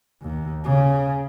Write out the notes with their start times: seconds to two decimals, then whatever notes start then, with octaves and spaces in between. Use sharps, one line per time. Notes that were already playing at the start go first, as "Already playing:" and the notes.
0.22 D#2
0.64 C#3